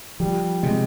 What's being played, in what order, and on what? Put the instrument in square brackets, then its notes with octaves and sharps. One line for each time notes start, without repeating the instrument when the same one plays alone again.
[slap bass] F3 [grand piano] G3
[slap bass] C3 [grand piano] G#3